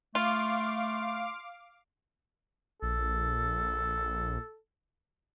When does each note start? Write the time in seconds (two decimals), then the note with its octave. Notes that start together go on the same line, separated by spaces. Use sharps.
0.15 A3 F4 F5 C6 D6
2.82 A#1 A4